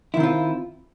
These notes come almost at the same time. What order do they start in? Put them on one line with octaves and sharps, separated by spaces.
E4 D#3 C4 F4